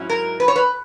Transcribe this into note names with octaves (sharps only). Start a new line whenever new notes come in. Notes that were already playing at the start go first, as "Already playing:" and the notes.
Already playing: G#2 F#3 C#4 E4
A#4
B4
C#5
B4